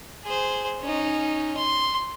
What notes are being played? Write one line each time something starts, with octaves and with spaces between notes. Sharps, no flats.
G#4 C5
C#4 D#4
C6